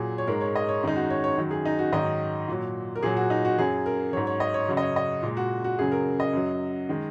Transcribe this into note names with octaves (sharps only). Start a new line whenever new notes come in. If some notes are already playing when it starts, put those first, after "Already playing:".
Already playing: A#2 F#3 G#4
C#5
G#2 G#3 A#4
C#5
D#5
C#5
F#2 D#3 G#3 D#4
F#4
C#5
C#5
F#2 D#3 F#3
G#4
D#4
F#4
G#2 D#3 F#3 D#5
A#2 F#3
A#4
A#2 F#3 G#4
F#4
D#4
F#4
F#2 F#3 G#4
A#4
G#2 F#3 C#5
C#5
D#5
C#5
F#2 C#3 F#3
D#5
C#5
D#5
A#2 G#3
F#4
F#4
F#2 C#3 F#3 G#4
A#4
D#5
F#2 F#3
D#3 G#3